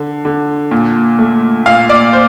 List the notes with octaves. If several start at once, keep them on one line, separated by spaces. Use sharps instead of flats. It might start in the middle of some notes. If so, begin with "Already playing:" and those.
Already playing: D3
D3
A#2
A3
A#2 F5
D5
C5